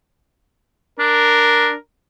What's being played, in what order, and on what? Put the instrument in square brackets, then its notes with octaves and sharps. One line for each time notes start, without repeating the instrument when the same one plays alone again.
[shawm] D4 [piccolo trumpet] A#4